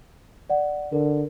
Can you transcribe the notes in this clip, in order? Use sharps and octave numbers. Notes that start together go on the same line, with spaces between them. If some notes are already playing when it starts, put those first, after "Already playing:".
D5 F#5
D3 A#4